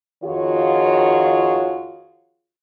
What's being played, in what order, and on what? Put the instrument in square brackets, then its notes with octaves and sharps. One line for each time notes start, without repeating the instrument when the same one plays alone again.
[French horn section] F2 D#3 F4 F#4 G#4 C#5